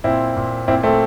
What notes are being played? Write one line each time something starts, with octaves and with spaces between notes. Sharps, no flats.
A#2 C4 E4
A#2
A#2 C4 E4
A3 C4